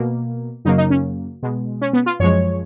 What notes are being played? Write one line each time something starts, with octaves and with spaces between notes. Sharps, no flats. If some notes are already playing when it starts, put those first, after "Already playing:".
Already playing: B2 A#3
F#2 C#3 F#3 A#3 D#4
D#4
C#4
B2 G#3
C#4
B3
F4
F#2 F3 G#3 C#5